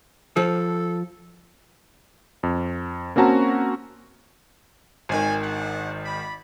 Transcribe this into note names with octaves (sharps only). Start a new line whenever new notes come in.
F3 A4
F2
A#3 C4 C#4 F#4 A5 A#5
G#1 D#3 C#5 G#5
D4 G#4 F#5
D5 B5